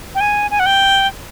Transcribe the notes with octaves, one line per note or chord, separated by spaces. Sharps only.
G5
G#5
G#5
F#5
G5